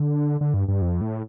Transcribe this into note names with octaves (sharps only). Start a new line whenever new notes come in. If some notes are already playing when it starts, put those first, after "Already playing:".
Already playing: D3
D3
G2
G2
F2
A2